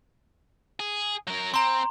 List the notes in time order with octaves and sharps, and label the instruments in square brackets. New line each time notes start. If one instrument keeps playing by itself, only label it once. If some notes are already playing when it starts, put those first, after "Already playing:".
[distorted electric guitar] G#4
F#3 A#4
[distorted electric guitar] C4 [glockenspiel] A#5 C6